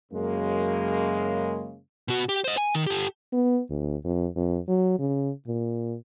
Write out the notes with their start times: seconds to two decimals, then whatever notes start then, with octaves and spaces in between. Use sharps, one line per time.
0.12 F#2 C#3 G#3 A#3
2.08 B2 F#4
2.29 G4
2.44 C5 D#5
2.57 G#5
2.75 D#3
2.87 G4 A4
3.33 B3
3.70 D2
4.05 F2
4.36 F2
4.68 F#3
4.99 C#3
5.47 A#2